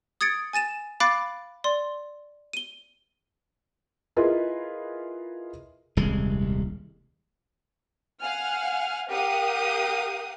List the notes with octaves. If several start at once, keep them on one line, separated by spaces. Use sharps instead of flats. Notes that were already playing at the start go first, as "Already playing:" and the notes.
D#6 G#6 A6 C#7 D7
G#5 A6 D#7 E7
F5 B5 D6 F#6 A6 D7
D5 C6
D#7 G7
E4 F4 G#4 A#4 B4 D#5
D#1 C2 G#3
F5 F#5 G#5 F6
G4 A#4 F5 F#5 D#6